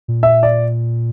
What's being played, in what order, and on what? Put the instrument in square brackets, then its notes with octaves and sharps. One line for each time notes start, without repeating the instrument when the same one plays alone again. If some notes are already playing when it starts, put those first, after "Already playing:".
[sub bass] A#2
[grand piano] E5
D5